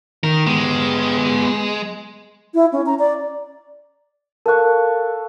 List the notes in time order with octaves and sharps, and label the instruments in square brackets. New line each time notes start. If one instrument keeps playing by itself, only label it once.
[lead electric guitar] D#3 [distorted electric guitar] A#4
[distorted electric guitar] G#3 [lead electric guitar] B3 G4
[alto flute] E4
C#4
A#5
D5
[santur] A4 F5 C#6 [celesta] A#4 F#6